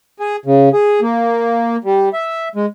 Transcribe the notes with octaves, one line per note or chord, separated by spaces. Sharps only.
G#4
C#3
G#4
A#3
G3
E5
G#3